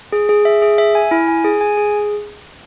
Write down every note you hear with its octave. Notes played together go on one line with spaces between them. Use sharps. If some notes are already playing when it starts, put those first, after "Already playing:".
G#4
G#4
E5
G#4
E5
G#5
E4
G#5
G#4
G#5
G#4